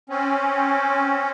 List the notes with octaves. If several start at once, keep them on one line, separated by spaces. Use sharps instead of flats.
C4 C#4